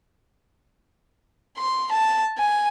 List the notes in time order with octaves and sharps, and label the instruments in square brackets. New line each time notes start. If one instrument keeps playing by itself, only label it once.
[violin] C6
A5
G#5